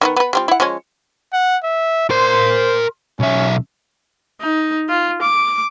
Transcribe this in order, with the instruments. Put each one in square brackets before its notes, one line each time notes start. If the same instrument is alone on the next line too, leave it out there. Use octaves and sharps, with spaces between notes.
[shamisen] D#3 F3 B3
B3 B4
G3 C4 F4
E4 F#5
F3 G#3 C#4
[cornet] F#5
E5
[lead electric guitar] A#4 C6 [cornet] C5
[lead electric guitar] B1 E5 [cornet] C#4
[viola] D#4
F4
D6